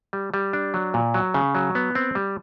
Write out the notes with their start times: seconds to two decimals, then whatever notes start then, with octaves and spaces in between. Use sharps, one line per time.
0.13 G3
0.34 G3
0.53 D4
0.74 F#3
0.94 A#2
1.14 F#3
1.34 C#3
1.55 F#3
1.75 B3
1.95 C4
2.15 G3